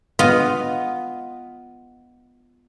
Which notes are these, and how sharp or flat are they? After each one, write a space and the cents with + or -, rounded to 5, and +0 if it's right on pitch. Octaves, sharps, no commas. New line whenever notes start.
B3 +0 F4 +0 D#5 +0